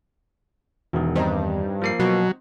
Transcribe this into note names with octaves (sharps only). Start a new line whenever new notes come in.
E1 E2 D#3
G2 C4 D#4 A#5
F3 A#3 C7
B2 F#3